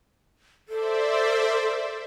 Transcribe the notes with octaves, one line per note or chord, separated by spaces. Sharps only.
A4 C5 D5 E5